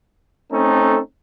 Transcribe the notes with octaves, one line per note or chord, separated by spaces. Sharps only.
A3 C4 C#4 D#4 A4